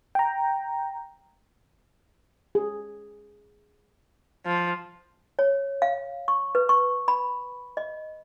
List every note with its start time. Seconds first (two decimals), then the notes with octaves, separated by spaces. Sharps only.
0.15 G5 A#5
2.55 G#4
4.46 F3
5.39 C#5
5.82 F5
6.28 C#6
6.55 B4
6.69 C#6
7.08 B5
7.77 D#5